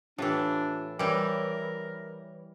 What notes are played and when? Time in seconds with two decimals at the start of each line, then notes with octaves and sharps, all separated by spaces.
0.18 A2 E3 D4 F4 G4
0.99 E3 G3 A#4 C#5 G5